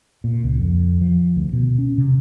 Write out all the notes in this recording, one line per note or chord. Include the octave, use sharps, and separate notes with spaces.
A#2
C#2
F2
F3
D2
B2
C#4
C3